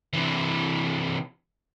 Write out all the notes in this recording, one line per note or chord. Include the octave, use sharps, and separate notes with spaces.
C3 E3